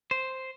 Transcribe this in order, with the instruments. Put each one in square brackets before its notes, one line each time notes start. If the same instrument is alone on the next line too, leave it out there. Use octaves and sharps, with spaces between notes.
[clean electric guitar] C5